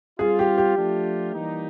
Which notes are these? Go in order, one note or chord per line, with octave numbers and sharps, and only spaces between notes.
G3 C4 F4 G#4
G4
G4
F3 A3 D4 F4
E3 G3 A#3 D#4